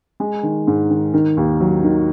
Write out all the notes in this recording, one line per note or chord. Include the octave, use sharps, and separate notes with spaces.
G#3
D#3
G#2
D#3
D#3
D#2
F#3
D#3